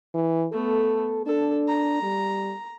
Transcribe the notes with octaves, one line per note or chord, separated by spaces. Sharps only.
E3
A3 B3 A4
D4 A4
A#5
G3